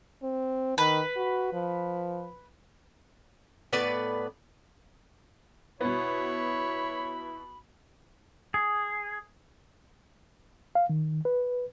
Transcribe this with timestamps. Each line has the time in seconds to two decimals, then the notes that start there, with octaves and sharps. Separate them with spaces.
0.23 C4
0.78 D#3 B4
1.16 F#4
1.53 F3
3.73 A2 B3 B4 D5
5.81 B2 B3 E4 C#5 B5
8.54 G#4
10.75 F5
10.90 D#3
11.25 B4